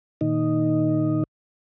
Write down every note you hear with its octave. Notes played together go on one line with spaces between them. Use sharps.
A#2 D#3 D#4